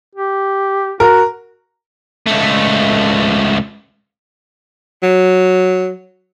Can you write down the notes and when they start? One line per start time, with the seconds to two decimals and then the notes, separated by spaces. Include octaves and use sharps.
0.15 G4
1.00 F#4 A#4
2.26 C#2 A3
5.03 F#3